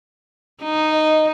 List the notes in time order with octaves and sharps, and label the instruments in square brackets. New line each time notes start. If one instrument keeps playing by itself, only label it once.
[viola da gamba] D#4
[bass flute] D#5